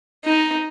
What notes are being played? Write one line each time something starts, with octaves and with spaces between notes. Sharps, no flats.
D#4